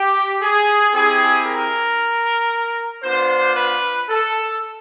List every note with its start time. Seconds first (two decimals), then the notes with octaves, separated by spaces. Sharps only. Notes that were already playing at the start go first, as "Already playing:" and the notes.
Already playing: G4
0.42 G#4
0.94 C4 E4 G4 G#4
1.47 A#4
3.04 B3 D4 F4 C5
3.56 B4
4.09 A4